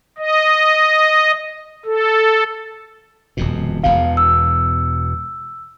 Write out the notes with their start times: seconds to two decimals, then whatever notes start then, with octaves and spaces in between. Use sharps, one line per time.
0.18 D#5
1.86 A4
3.37 D#1 F2 B2
3.84 E1 E2 B2 F5
4.17 E6